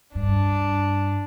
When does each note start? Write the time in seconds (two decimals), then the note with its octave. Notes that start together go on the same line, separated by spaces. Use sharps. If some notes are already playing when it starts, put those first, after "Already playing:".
0.15 G2 D4